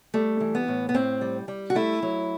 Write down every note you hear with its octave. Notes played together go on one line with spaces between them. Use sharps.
G3 A3
E3
B3
A2
B3
A2 C4
G3
G3
F#4
A3 E4
F#3